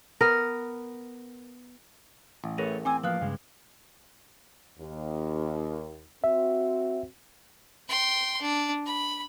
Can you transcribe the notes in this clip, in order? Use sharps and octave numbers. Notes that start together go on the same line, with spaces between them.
B3 A#4
A1
A3 G#4 A#4 B4 C#5 A#6
C4 G5 G#5 D6 E6
F3 A#3 B4 F5 D#6 F#6
G2 C#3 G#3
D#2
C4 F#4 E5
G5 C6
D4
B5